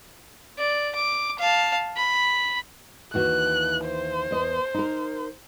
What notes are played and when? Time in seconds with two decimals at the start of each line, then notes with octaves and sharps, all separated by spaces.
0.59 D5
0.95 D6
1.39 F5 A5
1.97 B5
3.14 D#2 E3 F#4 F#6
3.86 C5
4.31 E2 D#5
4.74 D#4 A#4